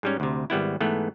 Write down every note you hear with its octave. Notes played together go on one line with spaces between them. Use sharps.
G#2 G3 C#4
D2 C3
G#1 G3 B3 E4
G#2 E3 A3 B3